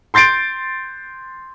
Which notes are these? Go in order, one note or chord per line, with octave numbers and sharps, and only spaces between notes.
C6 G6 A6 C7 D7